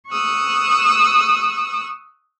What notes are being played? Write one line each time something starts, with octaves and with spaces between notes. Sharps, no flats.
C#6 D#6 E6 F#6